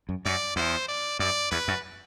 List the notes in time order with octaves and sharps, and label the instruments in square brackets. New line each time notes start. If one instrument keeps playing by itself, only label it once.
[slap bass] F#2
[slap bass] F#2 [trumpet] D5
[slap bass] E2 [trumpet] C5
[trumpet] D5
[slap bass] F#2 [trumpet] D5
[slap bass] E2 [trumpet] B4
[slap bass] F#2